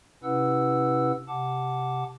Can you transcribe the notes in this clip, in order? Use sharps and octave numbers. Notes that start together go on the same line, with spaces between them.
C3 C#4 E4 B4 F#5 E6
C3 F#5 A5 D6